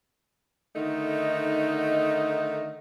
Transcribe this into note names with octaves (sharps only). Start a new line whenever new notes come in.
D3 D#3 A3 D#4